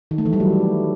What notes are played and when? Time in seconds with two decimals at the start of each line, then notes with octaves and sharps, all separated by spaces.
0.11 D#3
0.18 A3
0.26 E3
0.33 G3
0.40 F#3